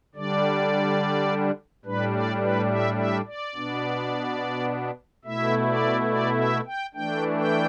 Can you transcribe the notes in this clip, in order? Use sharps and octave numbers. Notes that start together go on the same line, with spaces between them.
D3 G3 D4 D5
A2 G3 D4 B4
D5
B4
E5
E5
D5
B2 B3 D4
B2 A3 E4 E5
D5
D5
E5
G5
E3 A3 D4 G5
G5